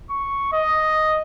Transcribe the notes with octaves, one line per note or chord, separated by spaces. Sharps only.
C#6
D#5